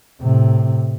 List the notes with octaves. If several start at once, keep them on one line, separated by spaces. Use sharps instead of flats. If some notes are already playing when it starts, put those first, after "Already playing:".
A2 C3